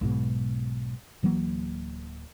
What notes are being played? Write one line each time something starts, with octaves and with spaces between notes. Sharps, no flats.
B1 G#2 B2
D1 E3 F#3 A#3